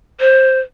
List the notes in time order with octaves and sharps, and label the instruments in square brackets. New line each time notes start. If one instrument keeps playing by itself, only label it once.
[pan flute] C5